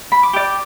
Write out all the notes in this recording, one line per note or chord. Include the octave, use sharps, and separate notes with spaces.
B5
D6
G4 D5